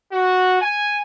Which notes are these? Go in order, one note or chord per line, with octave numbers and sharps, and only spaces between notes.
F#4
G#5